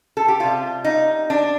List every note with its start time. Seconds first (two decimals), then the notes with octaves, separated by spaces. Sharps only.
0.17 A4
0.28 G4
0.40 C3 G3 F4
0.84 D#4
1.30 D4